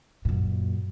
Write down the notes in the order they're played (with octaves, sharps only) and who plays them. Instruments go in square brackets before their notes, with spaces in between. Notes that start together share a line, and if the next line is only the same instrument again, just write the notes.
[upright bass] F#2 A#2